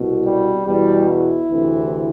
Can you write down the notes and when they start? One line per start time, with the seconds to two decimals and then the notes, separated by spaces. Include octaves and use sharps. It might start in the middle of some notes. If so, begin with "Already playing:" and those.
Already playing: C2 B2
0.26 G3
0.66 E2 B2 G3
1.09 E4
1.50 D2 C3 E3